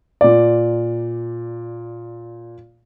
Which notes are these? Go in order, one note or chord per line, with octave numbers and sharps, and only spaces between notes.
A#2 D5